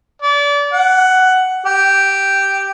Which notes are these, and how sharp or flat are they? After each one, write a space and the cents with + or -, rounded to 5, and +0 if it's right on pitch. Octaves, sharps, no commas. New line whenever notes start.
D5 -30
F#5 +10
G4 -5